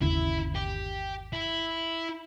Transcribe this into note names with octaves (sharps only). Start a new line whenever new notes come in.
G1 D#2 C#3 E4
G4
E4